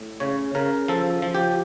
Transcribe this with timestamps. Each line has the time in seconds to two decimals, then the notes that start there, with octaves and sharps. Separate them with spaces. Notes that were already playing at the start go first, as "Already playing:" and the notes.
Already playing: A2
0.20 C#3 C#5
0.55 C#3 A#4
0.88 F3 A4
1.22 F3
1.35 G4